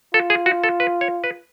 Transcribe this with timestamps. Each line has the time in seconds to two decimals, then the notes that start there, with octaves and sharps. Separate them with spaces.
0.14 F4 A4
0.30 G#4
0.46 F#4
0.64 A4
0.80 B4
1.01 C#5
1.24 B4